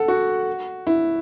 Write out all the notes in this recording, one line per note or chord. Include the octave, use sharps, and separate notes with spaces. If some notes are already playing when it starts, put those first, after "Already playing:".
Already playing: A4 F#5
F#4
E4